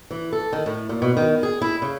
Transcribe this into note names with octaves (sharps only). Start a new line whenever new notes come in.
E3
A4
D#3
A2
A#2
B2
D#3
G#4
E4
C#3